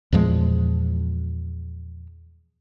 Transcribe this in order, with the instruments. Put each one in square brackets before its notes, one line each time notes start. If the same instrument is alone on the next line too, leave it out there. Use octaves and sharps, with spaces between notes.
[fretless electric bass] E2 A#2 F3 G#3